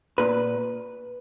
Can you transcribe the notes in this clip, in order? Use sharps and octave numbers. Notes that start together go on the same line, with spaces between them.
A#2 B4